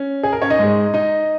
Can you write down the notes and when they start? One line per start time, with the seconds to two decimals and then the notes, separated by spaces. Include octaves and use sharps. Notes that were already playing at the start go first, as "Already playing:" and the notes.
Already playing: C#4
0.23 G#4
0.33 A#4
0.42 C#4 C#5
0.50 D#4 D#5
0.59 G#2 G#3
0.94 D#4 D#5